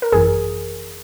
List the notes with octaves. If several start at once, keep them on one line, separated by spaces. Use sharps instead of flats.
A#4
G#1 F#2 E3 G#4